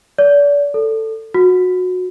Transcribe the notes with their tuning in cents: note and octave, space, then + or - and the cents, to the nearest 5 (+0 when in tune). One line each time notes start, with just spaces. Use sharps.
D5 -35
A4 +10
F#4 -20